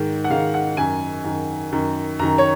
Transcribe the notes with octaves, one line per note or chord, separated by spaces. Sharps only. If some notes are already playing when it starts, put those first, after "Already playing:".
Already playing: G#2 D#3
F#5
G#2 D#3 F5
F#5
F#2 D#3 G#5
F#2 D#3
F#2 D#3
F#2 D#3 A#5
C#5